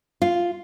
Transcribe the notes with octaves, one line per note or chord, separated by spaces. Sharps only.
F4